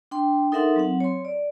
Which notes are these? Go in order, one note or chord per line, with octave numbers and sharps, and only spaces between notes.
D4 G5 C6
D#4 A4 A#4 E5 F#5 C6
F#3 C4 F#5
C#5 C6
D5